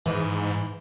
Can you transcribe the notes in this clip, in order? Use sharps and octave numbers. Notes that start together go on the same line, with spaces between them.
G#2 E3